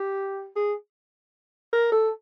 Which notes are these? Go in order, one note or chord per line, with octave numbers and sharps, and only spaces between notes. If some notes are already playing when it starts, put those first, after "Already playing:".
Already playing: G4
G#4
A#4
A4